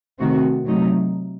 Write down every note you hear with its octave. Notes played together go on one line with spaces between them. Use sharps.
C3 D#3 A3 C4 F#4
C3 F#3 A3 D#4